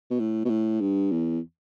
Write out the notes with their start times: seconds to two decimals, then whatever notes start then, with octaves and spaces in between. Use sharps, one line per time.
0.11 B2
0.20 A2
0.45 B2
0.50 A2
0.81 G2
1.11 E2